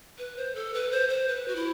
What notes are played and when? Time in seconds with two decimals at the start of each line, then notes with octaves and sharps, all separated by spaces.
0.19 B4
0.37 C5
0.55 A4
0.74 B4
0.91 C5
1.09 C5
1.28 B4
1.48 F#4
1.56 E4